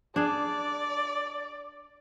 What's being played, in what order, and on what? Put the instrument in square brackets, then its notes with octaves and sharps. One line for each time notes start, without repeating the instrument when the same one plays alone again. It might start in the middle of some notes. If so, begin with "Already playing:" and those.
[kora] D4 G#4 [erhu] D5